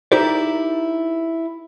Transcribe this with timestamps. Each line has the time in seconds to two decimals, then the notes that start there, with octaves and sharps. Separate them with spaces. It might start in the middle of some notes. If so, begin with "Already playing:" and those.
0.12 D#4 E4 G4 A#4 C5 D5